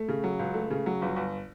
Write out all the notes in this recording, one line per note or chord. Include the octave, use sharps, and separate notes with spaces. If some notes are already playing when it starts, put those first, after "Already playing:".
Already playing: A3
C#3
F#3
C#2
A3
C#3
F#3
G1
G1